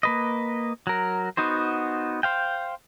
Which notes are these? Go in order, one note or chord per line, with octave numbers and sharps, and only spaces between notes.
A#3 B4 D#5
F#3 A#4
B3 D#4 F#4 C5
C5 F5 G5